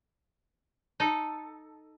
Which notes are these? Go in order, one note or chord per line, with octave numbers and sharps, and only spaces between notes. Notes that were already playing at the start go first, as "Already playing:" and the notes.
D#4 A4